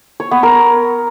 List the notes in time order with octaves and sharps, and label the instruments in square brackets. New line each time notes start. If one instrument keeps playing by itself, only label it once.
[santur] C#5
B3
A#4